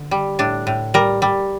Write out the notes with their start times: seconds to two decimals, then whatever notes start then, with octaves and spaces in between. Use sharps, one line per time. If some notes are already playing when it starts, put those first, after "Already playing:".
Already playing: D3
0.11 G3
0.39 A2 D4
0.67 A2
0.94 G3 A#4
1.22 G3